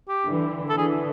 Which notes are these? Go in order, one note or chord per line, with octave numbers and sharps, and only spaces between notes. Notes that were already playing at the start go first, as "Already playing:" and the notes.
G4
D3 E3
A4
D3 E3 G#4